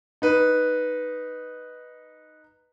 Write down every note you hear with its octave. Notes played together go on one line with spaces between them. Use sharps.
D#4 B4